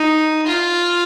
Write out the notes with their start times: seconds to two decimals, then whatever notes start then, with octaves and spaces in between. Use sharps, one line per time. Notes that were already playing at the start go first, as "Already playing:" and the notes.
Already playing: D#4
0.47 F4